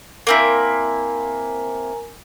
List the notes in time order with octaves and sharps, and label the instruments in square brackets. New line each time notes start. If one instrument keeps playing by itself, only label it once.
[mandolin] A#3 C4 E4 [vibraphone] A#4 G#5 A#5